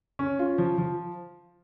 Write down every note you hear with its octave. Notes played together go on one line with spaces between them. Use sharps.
C#4
F4
F3
F3